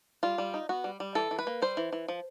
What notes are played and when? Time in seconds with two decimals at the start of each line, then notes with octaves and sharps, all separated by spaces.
0.23 G3 F4
0.38 G3
0.54 D#4
0.69 B3 F#4
0.84 G3
1.00 G3
1.15 E3 A4
1.31 E3
1.39 B4
1.47 A#3
1.62 G3 C5
1.77 E3
1.93 E3
2.08 F3